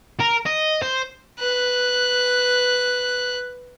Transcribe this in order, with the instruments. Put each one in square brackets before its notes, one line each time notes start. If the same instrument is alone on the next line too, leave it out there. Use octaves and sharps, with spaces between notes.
[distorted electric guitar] A#4
D#5
C5
[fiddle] B4 F#6